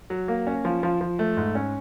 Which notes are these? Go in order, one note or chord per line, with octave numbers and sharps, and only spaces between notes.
F#3
A#3
C#4
F3
F3
F3
A3
G#2
C#4